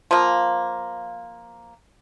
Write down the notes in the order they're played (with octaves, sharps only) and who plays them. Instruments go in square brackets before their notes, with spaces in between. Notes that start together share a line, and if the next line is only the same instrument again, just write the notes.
[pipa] F3 A#3